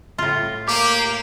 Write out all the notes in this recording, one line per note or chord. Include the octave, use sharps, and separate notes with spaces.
A2 F4
A#3 G4 D6